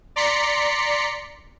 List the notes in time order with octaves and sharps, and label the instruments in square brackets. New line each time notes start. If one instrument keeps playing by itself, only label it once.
[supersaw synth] D5 A#5 C6 B6 C#7